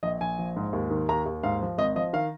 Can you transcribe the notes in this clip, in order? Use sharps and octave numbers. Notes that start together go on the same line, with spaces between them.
A#1 D#5
A#1 G#5
F3
G#2
D#2
D#3
D#2 A#5
D#2
G#2 F5
F3
G#1 D#5
F3 D#5
D#3 F5